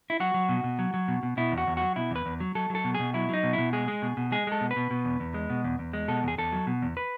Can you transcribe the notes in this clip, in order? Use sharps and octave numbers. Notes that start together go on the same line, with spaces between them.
E4
F#3 F#4
F#3
B2
B2
F#3
F#3
B2
B2
B2 E4
E2
F#4
E2
F#3 F#4
B2 E4
E2 B4
E2
F#3
F#3 A4
F#3 A4
B2
B2 G#4
F#3 E4
F#3 D#4
B2
E4
B2
G#3 G#4
G#3
B2
B2
G#3 G#4
G#3 A4
B2
B4
B2
B2
E2
E2
G#3
B2
E2
E2
G#3
B2 A4
E2 G#4
E2 A4
F#3
B2
E2
B4